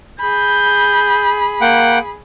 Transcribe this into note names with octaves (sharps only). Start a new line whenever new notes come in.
G#4 B5 G6
A#3 F#5 G5